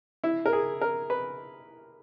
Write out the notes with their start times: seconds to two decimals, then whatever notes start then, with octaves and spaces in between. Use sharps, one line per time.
0.24 E4
0.46 A#4
0.53 G#4
0.81 A#4
1.10 B4